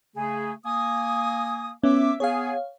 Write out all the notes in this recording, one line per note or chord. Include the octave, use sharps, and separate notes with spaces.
C#3 A3 G#4
A#3 G#5 D#6
B3 C#4 E5 D6
B3 G#4 C#5 F5